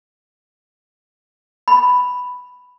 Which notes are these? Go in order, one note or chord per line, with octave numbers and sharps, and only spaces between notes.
B5